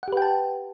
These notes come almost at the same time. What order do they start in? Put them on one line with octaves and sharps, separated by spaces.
F#5 G4 B4 G5 A5